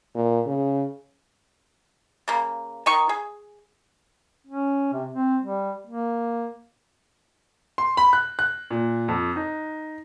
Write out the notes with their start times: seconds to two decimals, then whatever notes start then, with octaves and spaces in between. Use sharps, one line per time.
0.15 A#2
0.46 C#3
2.28 C#3 A#3
2.86 D#3 D#4 C#6
3.09 G#4
4.47 C#4
4.93 C3
5.11 C4
5.42 G3
5.87 A#3
7.78 C6
7.97 B5
8.13 F#6
8.39 F#6
8.71 A#2
9.08 F2
9.36 D#4